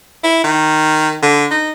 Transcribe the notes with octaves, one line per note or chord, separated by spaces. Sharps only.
E4
D#3
D3
D#4